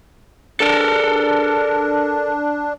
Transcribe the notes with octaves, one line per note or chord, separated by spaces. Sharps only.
D4 A4 A#4